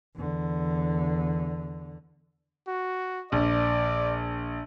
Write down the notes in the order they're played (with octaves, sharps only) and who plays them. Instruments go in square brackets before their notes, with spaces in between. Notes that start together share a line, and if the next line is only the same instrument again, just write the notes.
[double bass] E2 D3
[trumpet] F#4
[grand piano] A#1 [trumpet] D5